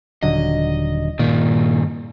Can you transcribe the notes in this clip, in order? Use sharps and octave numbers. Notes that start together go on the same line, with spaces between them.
D#1 D3 F#3 D#5
G2 A#2 D#3